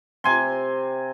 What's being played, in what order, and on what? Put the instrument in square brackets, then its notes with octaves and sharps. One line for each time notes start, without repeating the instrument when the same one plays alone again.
[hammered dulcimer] C3 G#5 C6